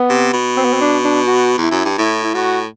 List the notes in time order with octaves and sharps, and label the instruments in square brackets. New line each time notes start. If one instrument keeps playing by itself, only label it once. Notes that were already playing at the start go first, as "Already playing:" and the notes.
Already playing: [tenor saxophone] B3
[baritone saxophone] C3
B2
[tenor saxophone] C4
B3
C4
D4
D4
F#4
[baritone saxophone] E2 [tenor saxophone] E4
[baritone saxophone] F#2
G2
[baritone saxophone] A2 [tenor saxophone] E4
[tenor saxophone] E4
[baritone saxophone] A2 [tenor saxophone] F#4